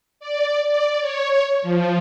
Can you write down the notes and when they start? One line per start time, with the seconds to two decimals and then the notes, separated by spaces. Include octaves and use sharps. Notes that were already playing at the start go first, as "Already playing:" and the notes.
0.20 D5
0.67 D5
1.01 C#5
1.62 F3